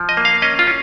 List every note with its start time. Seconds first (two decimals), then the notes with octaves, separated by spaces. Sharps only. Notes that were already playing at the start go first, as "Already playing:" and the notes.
Already playing: F3
0.09 D#5
0.17 A#3
0.25 F5
0.42 C#4 D#5
0.59 F4
0.67 C#4